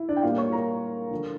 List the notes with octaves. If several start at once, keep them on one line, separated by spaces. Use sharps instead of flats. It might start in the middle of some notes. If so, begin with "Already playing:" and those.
Already playing: E4
D4 D5
G5
A#2 G3 A#3 F4 F5
C#5 C#6
A#4 A#5
D3 F3 A3